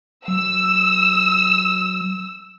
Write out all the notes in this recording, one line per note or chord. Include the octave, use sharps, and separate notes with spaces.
F#3 E6